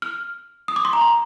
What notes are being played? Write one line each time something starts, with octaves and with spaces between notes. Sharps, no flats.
F6
D#6
D6
C6
A#5
C6